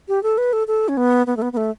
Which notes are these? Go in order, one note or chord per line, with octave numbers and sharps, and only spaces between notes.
G4
A4
B4
A4
A4
C#4
B3
B3
A3
B3
B3
A3